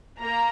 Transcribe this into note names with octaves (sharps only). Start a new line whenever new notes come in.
A#3 A#5